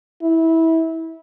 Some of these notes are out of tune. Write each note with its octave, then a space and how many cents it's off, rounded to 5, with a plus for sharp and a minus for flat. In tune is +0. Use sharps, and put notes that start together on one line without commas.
E4 -20